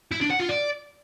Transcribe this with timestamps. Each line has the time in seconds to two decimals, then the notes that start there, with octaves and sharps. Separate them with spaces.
0.12 E4
0.21 D4
0.30 F#5
0.39 F4
0.49 D5